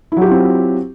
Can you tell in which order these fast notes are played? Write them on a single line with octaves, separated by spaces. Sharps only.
E4 F#3 G4 F4 C4